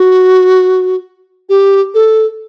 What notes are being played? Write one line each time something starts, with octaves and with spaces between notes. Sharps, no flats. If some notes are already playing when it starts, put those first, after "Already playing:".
Already playing: F#4
G4
A4